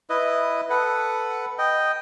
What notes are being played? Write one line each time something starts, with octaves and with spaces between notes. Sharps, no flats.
E4 B4 D#5
A4 B4 F#5
D#5 G5